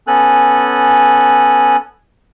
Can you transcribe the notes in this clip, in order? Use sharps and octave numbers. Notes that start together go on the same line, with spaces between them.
B3 C#4 A4 G#5 F#6